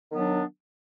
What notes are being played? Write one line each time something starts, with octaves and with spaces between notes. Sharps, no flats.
D#3 F#3 B3 D4